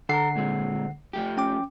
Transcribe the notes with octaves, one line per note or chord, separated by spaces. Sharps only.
D3 A4 F#5 A5 A#5 C7
A#2 G#3 C4
F3 A3 G4
C#4 G5 D6